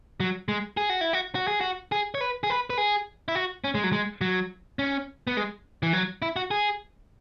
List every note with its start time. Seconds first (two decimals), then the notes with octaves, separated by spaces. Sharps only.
0.20 F#3
0.48 G#3
0.77 G#4
0.90 F#4
1.01 E4
1.13 F#4
1.35 F#4
1.48 G#4
1.61 F#4
1.92 G#4
2.15 C#5
2.21 B4
2.43 G#4
2.50 B4
2.70 B4
2.78 G#4
3.28 E4
3.35 F#4
3.64 C#4
3.75 G#3
3.84 F#3
3.92 G#3
4.21 F#3
4.79 C#4
5.27 B3
5.37 G#3
5.83 E3
5.93 F#3
6.22 E4
6.36 F#4
6.51 G#4